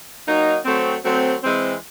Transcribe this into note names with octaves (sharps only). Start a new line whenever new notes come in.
F#3 A#3 D#4
F#3 A3 C4
F#3 A3 C4
E3 G#3 C4